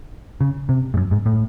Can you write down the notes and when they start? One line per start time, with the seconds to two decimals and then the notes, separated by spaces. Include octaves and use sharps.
0.41 C#3
0.69 C3
0.94 G#2
0.97 F#2
1.11 G#2
1.26 A2